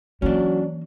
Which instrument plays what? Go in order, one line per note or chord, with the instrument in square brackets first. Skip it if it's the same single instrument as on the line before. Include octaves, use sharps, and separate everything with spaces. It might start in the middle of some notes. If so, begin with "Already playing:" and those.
[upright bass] E3 A#3 [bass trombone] F#3 [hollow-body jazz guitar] C#4 D4